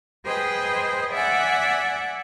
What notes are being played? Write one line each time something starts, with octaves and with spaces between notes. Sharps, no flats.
G#4 B4 C5 D#5 G5
D5 E5 F#5 G#5